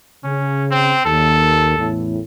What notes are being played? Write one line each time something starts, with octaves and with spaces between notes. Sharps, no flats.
C#3 C#4
C4
D#2 A4
A1 E2 A2